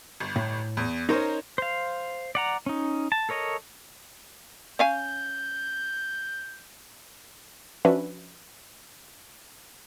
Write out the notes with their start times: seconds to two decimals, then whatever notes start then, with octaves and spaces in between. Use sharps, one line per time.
0.20 G1
0.36 A2
0.77 E2
1.09 C#4 D#4 A#4 C5 C#5
1.58 C5 F5
2.35 D5 F#5 A#5
2.66 C#4 D#4
3.12 A5
3.29 A4 A#4 C#5 D#5
4.79 C#4 F5 G#5 G6
7.85 F3 C#4 D4 F#4 B4 E5